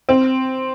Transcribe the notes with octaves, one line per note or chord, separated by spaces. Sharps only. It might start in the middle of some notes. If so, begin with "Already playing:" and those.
C4